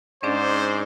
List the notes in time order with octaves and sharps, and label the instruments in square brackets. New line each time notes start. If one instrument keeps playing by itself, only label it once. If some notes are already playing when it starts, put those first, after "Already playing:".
[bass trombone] G#2 [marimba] C#4 D4 G#4 [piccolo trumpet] C5 [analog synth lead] D5